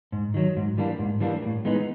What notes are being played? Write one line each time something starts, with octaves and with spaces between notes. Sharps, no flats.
G#2
D#3 F#3
G#2
E3 G3 A#3 D4
G#2
E3 G3 A#3 D4
A2
E3 G#3 B3 D#4